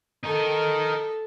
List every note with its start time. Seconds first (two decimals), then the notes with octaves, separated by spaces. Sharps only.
0.24 D#4 A4 A#4